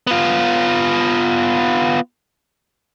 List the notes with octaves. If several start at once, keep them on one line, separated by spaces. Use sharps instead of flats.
B3 F4